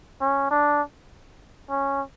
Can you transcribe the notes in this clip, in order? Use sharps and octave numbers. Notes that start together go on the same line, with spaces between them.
C#4
D4
C#4